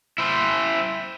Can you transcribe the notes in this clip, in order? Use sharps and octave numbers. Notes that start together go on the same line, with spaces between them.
E4 C5